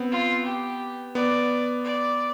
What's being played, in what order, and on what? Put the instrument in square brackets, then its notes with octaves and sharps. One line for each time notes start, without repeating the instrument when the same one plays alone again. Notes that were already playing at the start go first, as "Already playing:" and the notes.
Already playing: [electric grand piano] B3 C4
[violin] F4
G4
[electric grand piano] B3 [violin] D5
[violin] D5